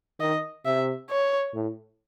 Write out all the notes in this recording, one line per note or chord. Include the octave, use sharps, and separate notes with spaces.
D#3 D#5
C3 E5
C#5
A2